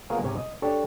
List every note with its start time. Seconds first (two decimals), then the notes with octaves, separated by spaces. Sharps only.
0.10 A#3 B3 F4 G#4 A#4 C#5
0.22 G#2 C3 C#5 G#5
0.36 D#5
0.62 D4 G4 A4 C#5